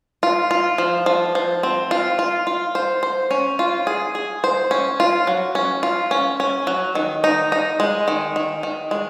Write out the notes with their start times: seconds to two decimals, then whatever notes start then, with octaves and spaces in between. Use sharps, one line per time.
0.23 F4
0.51 F4
0.78 F3
1.06 F3
1.35 F3
1.63 C4
1.91 F4
2.19 F4
2.47 F4
2.75 C5
3.03 C5
3.31 C#4
3.59 F4
3.87 G#4
4.15 G#4
4.44 C5
4.71 C#4
5.00 F4
5.27 F#3
5.55 C#4
5.83 F4
6.11 C#4
6.40 C#4
6.67 F#3
6.95 D#3
7.24 D#4
7.52 D#4
7.80 G#3
8.08 D#3
8.36 D#3
8.63 D#3
8.91 G#3